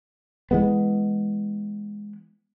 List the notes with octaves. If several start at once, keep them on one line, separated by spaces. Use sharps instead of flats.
E3 G#3 B3